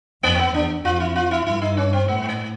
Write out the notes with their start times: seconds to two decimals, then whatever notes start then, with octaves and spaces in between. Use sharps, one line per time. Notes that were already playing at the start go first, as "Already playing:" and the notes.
0.23 F2 A#3
0.34 C4
0.39 B3
0.54 E2 D4
0.85 F2 F4
1.00 E4
1.16 F4
1.31 E4
1.46 G2 E4
1.62 D#4
1.77 C#4
1.93 C4
2.08 A2 B3
2.23 A3
2.28 A#3